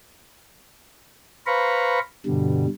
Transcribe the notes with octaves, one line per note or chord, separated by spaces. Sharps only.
B4 C5 F5 A#5 B5 C#6
G2 B2 D3 G3